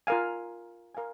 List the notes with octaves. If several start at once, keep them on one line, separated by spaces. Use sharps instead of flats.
F4 A#4 F5 G#5
A#4 F5 G#5